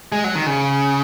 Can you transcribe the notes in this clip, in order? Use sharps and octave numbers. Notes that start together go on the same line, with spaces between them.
G#3
F#3
D#3
C#3